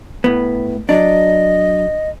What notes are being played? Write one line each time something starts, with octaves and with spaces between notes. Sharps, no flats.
A2 B3
F#3 D4 D#5